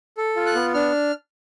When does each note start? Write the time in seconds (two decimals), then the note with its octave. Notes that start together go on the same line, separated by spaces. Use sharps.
0.17 A4
0.36 F4
0.46 F#6
0.55 B3
0.74 D4 F6